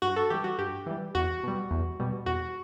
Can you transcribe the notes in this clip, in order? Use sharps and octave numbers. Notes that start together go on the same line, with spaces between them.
G2 F#4
A4
E3 G3 G4
F#4
G2 G4
E3 G3
E2 F#4
B2 G3
E2
B2 G3
E2 F#4